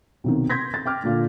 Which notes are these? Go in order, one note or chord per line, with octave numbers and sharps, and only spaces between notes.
B1 C3 D#3
C6 G6 G#6 A#6 B6
A6
G5 D6 F6
A#2 D3 F4